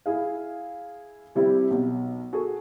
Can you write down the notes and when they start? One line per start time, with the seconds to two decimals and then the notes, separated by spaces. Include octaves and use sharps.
0.06 E4 G#4 F5
1.35 C3 G3 C4 E4 G4
1.70 B1
2.33 F#4 G#4 A4